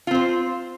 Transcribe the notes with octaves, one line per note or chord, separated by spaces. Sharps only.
C4 F4 C5